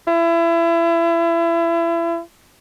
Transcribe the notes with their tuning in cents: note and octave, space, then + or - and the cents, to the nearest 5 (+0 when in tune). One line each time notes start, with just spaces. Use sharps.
E4 +30